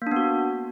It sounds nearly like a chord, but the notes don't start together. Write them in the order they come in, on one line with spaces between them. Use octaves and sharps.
A#3 D4 B3 F#4